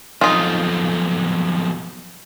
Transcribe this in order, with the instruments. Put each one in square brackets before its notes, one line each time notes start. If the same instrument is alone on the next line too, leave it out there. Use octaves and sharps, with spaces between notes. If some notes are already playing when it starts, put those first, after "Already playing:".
[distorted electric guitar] B1 F2 [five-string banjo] D#4 F4